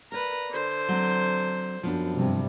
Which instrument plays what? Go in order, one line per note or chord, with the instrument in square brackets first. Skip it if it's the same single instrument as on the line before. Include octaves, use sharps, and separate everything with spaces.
[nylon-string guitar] A#4 D5 [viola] B4 A#5
[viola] D3 C5
[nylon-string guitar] F#3 C4
[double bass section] F#2 [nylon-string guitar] F3 B3 D4
[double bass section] G2 C3 G3